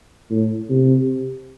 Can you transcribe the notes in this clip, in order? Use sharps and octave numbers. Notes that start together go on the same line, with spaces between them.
A2
C3